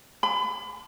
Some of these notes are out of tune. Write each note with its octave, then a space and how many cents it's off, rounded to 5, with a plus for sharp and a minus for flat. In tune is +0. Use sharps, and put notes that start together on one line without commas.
B5 +35